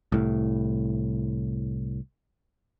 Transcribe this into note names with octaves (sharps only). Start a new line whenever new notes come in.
C2 A2